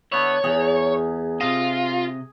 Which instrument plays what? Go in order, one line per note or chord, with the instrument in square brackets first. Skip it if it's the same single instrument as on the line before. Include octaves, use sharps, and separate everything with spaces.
[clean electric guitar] D3 B3 E4 [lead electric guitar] C#5
[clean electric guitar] E2 [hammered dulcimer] G#4
[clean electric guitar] C3 D#5 [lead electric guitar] F4